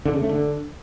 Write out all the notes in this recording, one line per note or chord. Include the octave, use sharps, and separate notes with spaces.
D3
C#3
A3
D3